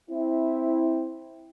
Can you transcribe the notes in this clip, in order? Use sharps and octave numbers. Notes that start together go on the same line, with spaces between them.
C4 E4